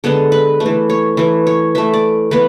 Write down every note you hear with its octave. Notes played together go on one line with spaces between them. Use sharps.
D3 G#3 B3 A4
B4
A3
E3
C#5
E3 A3
C#5
E3 A3 E5
D5
E3 B3 B4